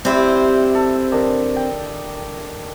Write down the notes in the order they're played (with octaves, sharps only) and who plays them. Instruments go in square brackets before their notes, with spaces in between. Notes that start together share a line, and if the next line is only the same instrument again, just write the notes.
[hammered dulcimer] C3 G3 E4 [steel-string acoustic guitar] C4 C5
[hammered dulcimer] A4
D#3 D4
G5